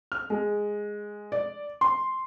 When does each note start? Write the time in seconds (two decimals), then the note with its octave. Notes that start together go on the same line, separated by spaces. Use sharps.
0.12 F6
0.30 G#3
1.32 D5
1.81 C6